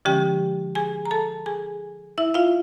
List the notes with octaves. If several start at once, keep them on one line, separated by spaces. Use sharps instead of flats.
D3 F3 G#3 C#4 G4 G5
G#4 G#5
A#5
A4 A5
G#4 G#5
E4 E5
F4 F5